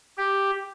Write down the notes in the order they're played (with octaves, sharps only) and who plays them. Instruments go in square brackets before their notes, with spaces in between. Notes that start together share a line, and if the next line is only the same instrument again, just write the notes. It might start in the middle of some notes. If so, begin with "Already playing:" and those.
[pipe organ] G4